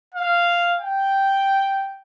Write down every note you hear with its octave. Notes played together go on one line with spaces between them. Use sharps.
F5
G5